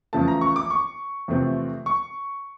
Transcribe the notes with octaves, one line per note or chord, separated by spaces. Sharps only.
E2 C#3 F3 A3 A5
A#5
C#6
D6
C#6
E2 C3 F3 A3 C4
C#6